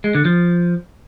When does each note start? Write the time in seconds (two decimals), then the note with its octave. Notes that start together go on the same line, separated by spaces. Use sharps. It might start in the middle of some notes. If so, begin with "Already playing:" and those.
0.04 G#3
0.15 D3
0.25 F3